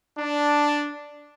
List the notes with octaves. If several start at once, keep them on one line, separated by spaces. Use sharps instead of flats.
D4